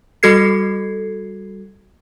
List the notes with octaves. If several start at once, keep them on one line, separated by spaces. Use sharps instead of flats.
G3 F#4 A4 G#6 C7